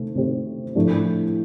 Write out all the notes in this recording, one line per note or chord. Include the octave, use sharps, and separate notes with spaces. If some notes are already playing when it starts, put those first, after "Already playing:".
Already playing: C3 D#3 A3 C4
C3 D#3 A3 C4 G4
A2 F3 A3 D4 G4